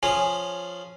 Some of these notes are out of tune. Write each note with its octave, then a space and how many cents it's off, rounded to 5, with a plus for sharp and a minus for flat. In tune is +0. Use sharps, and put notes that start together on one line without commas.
F3 +0 C#4 +0 G#4 +0